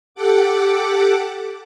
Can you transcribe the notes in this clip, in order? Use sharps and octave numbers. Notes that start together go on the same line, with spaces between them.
G4 A4 F#5 D6